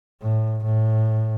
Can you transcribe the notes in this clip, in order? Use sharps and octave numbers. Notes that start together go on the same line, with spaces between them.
A2
A2